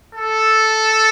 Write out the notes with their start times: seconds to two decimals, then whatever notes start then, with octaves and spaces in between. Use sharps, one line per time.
0.15 A4